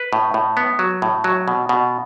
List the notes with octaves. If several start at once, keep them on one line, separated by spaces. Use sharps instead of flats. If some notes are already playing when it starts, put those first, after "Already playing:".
Already playing: B4
A2
A2
B3
F#3
A2
F#3
B2
B2